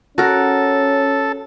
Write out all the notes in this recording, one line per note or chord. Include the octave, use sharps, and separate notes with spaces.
C#4 F#4 A4 A#4